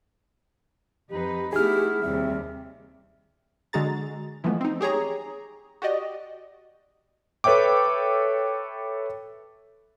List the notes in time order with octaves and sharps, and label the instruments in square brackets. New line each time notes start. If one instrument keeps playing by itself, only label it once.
[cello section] F2 D#4 B4 [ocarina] G4
[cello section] A3 B3 E4 [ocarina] D#4 [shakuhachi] G4 [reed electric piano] G#4 F6
[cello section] D#2 C3 G3 [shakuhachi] C4 [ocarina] E5
[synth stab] D3 G#3 F#4 G#4 A#5 A6
E3 F3 G#3 A3 B3
C4 D#4
G4 G#4 C#5 A#5
F#4 G4 D5 D#5
[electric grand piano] A4 B4 C#5 E5 G5 D6